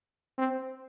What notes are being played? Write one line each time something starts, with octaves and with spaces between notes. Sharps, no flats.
C4